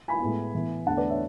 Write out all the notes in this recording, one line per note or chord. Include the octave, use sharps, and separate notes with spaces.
G#5 B5
A2 G#3 B3
A2 E3 B3
E2 D3 A3 F#5 A5
B4 D5
C#5 E5